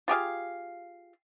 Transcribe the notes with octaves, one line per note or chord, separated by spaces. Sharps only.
F4 G4 G#4 F5